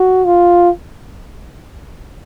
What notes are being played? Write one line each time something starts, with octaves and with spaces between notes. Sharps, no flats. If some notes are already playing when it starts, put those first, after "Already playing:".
Already playing: F#4
F4